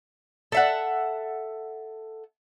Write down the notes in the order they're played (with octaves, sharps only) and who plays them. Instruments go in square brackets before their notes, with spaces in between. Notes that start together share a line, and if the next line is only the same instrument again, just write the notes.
[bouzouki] A4 E5 F#5